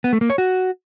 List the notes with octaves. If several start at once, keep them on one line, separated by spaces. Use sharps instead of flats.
B3
A3
A#3
C#5
F#4